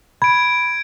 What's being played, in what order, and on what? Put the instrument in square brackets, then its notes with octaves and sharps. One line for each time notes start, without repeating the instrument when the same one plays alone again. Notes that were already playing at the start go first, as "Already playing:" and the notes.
[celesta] B5 [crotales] G#6 D7